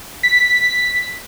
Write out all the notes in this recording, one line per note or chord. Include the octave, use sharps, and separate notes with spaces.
B6